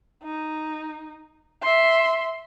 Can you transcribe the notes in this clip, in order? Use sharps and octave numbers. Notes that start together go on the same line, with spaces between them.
D#4
E5 C6